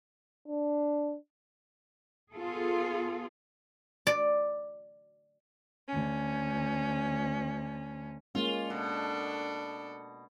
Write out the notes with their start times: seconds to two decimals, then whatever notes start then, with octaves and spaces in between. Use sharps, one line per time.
0.48 D4
2.33 B3 F4 G#4 A4
4.07 D5
5.89 D2 C#4
8.35 G#3 A#3 C#4 F4
8.70 B2 D4 A4